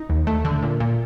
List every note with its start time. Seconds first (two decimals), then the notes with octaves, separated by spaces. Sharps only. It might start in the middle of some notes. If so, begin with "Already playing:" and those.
Already playing: D#4
0.10 D#2
0.27 A3
0.45 D3
0.63 A#2
0.80 A#2